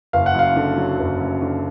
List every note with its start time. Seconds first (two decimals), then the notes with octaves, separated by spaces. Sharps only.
0.13 F#1 F5
0.26 F#5
0.35 F#2 F5
0.56 D3
0.78 F#3
0.99 F#1
1.20 F#2
1.42 D3